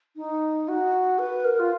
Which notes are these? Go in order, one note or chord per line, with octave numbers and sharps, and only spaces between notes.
D#4
F#4
B4
A#4
F4